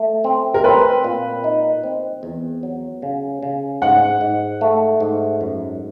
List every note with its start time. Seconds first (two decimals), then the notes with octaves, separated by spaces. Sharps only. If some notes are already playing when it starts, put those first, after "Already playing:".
Already playing: A3
0.24 C4
0.54 A#4
0.64 C4 B4
1.04 A#2
1.44 D#4
1.84 C4
2.23 E2
2.63 F#3
3.02 C#3
3.43 C#3
3.82 G#2 F#5
4.21 G#2
4.61 A3
5.00 G#2
5.41 F#2